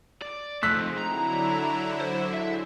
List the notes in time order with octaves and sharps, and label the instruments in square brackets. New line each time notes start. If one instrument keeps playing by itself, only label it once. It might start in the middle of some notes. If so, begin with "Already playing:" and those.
[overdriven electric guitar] D5
[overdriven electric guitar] F3 A3 [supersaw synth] G#3 C4 D#4 [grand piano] E6 F#6 B6
[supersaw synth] D3 F#3 E4 [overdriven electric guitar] A#5
[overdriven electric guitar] C5
[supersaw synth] G#3 C5 [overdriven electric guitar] E5